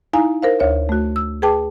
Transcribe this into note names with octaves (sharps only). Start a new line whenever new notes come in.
D#4 E4 F5 G#5 A#5
A#4 C5 F5
D2 C#5 E5
A3 F#4
E6
G#4 B4 G5 A5 D6